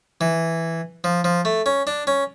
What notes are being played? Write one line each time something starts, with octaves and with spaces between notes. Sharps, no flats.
E3
F3
F3
A3
C#4
D4
C#4